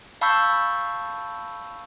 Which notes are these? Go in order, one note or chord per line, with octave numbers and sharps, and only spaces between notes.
F5 A5 B5 C#6 E6 G6